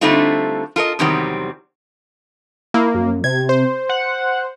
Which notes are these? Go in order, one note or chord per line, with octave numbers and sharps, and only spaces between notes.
D3 G3 A3 C4 D#4 F4
F4 A4 A#4 D#5
E2 C3 D#3 F#3 G3 C4
A#3 E4
F#2
C3 G#6
C5
F#5